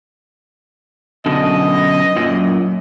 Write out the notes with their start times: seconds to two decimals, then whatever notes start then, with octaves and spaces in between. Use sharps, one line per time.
1.26 F#2 B2 D3 D#5
2.16 F#2 A#2